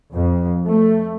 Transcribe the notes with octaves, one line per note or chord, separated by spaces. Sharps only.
F2
A3